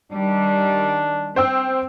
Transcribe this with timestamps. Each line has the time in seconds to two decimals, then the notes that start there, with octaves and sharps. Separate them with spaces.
0.12 D#3 G3 D4
1.36 C4 C5 G5 E6